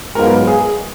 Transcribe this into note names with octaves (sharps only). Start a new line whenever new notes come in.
G#2 F#3 B3 F4 A#4 B4
G#4